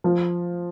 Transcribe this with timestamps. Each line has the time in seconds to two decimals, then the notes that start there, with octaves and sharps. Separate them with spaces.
0.04 F3